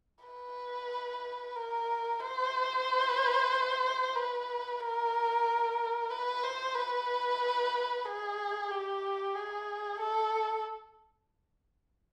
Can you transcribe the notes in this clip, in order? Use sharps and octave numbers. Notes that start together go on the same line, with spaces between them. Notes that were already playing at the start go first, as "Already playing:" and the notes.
B4
A#4
C5
B4
A#4
B4
C5
B4
G#4
G4
G#4
A4